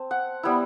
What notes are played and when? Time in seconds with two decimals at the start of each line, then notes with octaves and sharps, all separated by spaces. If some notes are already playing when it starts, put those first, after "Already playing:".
Already playing: C4 A5
0.11 F#5
0.43 G3 B3 E4